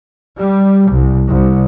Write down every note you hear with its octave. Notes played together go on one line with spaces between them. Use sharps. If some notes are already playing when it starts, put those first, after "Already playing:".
G3
C2
C2